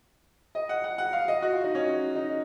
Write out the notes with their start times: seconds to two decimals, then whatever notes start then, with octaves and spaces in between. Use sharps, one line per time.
0.55 D#5
0.69 F#5
0.84 F#5
0.98 F#5
1.13 F5
1.28 D#5
1.42 F#4
1.53 F4
1.64 D#4
1.75 C#4
1.86 D#4
2.16 D#4